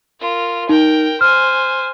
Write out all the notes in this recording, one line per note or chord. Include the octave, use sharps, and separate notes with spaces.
F4 A#4
D#4 A#4 G5
C5 G#5 F6